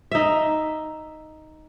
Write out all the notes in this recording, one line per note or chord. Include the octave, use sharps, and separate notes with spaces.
D#4 E5